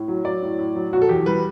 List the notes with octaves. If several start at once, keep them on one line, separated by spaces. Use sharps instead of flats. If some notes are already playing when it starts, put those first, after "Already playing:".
Already playing: A2
F#3
F#3 D5
A2
A2
F#3
B2 F#4
A4
E2 G4
G3 B4